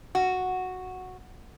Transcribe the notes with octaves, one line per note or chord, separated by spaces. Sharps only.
F#4